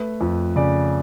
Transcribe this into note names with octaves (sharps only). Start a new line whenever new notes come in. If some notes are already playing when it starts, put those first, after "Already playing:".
Already playing: A3 B4
F2
C#3 D5